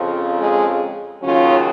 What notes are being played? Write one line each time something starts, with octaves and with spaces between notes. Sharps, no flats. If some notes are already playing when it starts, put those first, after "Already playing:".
Already playing: F2 C#3 F3
G#3
D#2 C#3 F#3 C#4 F4